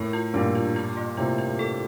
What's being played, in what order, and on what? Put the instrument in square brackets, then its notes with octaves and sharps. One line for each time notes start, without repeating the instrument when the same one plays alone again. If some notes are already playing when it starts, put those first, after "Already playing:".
Already playing: [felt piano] A2 [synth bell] A#4
[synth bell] F4
[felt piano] G2 A#2 [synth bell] D4
[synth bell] F4
F4
A#3
[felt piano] A2 C3 [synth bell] F4
[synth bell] F4
A4